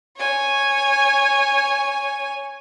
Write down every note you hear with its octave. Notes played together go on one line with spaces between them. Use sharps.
C#5 G#5